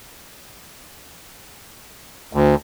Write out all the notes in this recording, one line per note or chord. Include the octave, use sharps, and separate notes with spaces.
D2